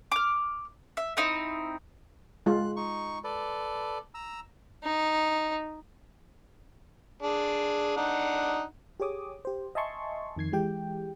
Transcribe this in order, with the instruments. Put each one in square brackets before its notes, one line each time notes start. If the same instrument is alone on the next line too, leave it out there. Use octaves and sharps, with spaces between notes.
[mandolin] D6 F6
E5
C4 D#4 E4
[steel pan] G#3 F4 [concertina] F#6
[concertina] D#4 C#6
A4 B4 D5
A#5 E6
[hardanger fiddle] D#4
[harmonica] D4 G#4
D4 D#4 F#5
[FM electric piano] G4 G#4 C#5 D6 D#6
G4 C5
D#5 E5 G#5 A5 C6 C#6
F2 D#3 G#6 C7
E3 G#3 G4 G5